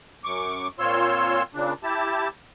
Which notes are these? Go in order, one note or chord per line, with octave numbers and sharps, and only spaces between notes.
F#2 C#6 D6
A#2 C4 F4 C#5 C6 E6
A#2 C#3 D4
E4 G4 A5